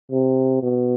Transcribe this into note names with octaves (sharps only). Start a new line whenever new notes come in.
C3
B2